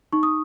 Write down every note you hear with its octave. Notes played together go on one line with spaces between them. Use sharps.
D#4 C#6
D#6